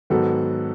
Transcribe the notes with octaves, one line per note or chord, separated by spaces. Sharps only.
G#2 D#3 F#3 B3 F#4 A4